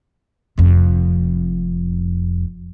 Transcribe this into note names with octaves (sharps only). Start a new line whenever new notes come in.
F1 F2